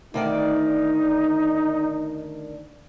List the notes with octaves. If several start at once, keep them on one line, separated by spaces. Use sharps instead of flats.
D2 D#3 D#4 D5